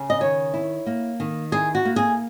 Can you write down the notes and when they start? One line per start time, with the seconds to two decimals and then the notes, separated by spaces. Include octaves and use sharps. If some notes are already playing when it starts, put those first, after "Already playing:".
Already playing: C#3
0.10 D#5
0.20 D#3 C#5
0.54 E4
0.86 A#3
1.20 D#3
1.52 E4 G#4
1.75 F#4
1.85 A#3
1.96 G#4